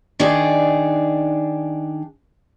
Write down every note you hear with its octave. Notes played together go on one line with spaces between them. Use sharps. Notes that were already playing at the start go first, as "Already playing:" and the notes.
D#3 D4 D#4 G#4 D5